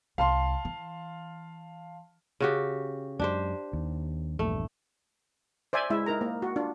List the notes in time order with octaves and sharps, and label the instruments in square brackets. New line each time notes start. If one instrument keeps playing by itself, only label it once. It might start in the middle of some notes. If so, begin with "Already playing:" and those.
[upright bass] C2 [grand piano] F5 A5 C6
[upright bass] E3
[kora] C#3 F#4 G4
[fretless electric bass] F#2 G#3 [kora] D4 G4 C5
[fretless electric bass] D#2
[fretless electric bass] A#1 E2 G2 [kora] A3
[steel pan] C5 D5 E5 G#5
G#3 E4 E5
D#4 A#4 A#5
A#3
F#4
D4 F4